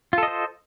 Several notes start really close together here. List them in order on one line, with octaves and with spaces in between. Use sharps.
F4 A4 D#5 C5